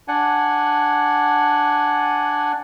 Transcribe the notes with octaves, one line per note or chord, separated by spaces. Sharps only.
D4 F#5 G#5